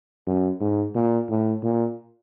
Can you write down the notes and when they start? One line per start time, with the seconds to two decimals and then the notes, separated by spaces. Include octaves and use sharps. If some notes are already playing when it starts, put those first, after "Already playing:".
0.27 F#2
0.61 G#2
0.95 A#2
1.30 A2
1.63 A#2